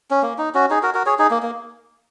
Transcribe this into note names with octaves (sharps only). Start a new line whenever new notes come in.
C#4
A#3
D#4
C#4 F#4
D#4 G#4
F#4 A#4
F#4 A#4
G#4 C#5
D#4 G#4
A#3
A#3